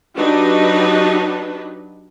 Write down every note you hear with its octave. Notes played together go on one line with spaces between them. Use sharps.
F#3 D4 D#4 G4 B4